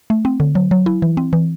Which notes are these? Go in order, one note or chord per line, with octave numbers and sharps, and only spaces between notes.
A3
C4
D3
F#3
F#3
E4
E3
C4
E3